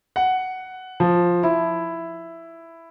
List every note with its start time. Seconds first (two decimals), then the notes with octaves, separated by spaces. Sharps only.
0.16 F#5
1.00 F3
1.43 E4